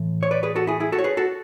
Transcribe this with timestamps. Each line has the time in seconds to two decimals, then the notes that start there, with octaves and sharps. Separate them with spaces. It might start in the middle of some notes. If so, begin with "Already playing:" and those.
Already playing: A2 E3
0.23 C#5
0.31 B4 D5
0.43 G#4 B4
0.56 F#4 A4
0.67 E4 G#4
0.80 E4 G#4
0.92 F#4 A4
0.98 C#5
1.04 G#4 B4
1.17 F#4 A4